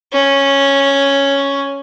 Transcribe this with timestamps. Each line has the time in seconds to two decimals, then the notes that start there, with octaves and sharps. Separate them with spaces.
0.13 C#4